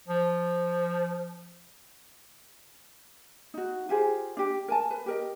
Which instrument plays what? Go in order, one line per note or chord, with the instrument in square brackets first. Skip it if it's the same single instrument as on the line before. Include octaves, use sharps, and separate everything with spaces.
[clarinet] F3
[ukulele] D#4 F#4
F4 G4 G#4 C5
D4 G4
A#4 G#5 A5
B4
G4 A#4 D#5